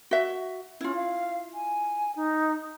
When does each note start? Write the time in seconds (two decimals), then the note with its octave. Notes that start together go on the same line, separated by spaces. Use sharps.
0.11 F#4 E5
0.81 C#4 E4 F4
0.95 F5
1.54 G#5
2.16 D#4